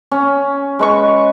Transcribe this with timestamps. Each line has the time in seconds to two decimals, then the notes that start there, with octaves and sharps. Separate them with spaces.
0.11 C#4
0.79 G#3 B4 C#6